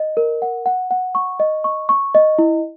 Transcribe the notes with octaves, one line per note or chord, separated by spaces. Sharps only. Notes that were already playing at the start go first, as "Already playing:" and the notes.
Already playing: D#5
A#4
F#5
F#5
F#5
C#6
D#5
C#6
C#6
D#5
E4